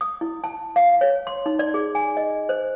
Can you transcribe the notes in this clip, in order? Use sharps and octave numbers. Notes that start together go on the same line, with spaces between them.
D#6
E4
A5
F5
C#5
C6
D#4
D5
G#4
G#5
D#5
C5